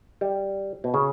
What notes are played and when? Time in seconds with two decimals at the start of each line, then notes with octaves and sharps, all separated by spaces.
0.21 G3
0.84 B2
0.94 C#3